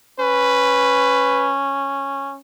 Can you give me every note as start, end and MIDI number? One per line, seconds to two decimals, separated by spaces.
0.20 2.38 61
0.20 1.53 71